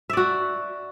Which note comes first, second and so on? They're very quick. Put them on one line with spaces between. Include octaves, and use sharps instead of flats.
E5 D5 F#4